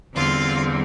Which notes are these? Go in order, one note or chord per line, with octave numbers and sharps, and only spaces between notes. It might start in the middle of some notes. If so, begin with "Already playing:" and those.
E2 D3 G3 C4 F4 F5